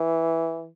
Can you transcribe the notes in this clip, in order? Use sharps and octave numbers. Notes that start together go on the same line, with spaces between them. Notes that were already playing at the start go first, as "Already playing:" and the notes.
Already playing: E3